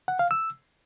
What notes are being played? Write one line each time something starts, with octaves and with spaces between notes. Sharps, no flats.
F#5
F5
E6